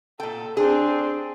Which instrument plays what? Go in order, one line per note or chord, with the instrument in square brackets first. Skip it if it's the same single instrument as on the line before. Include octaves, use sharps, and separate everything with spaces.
[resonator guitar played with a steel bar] A#2 G5 [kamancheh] A4
[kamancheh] C4 D4 [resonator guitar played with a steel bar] G#4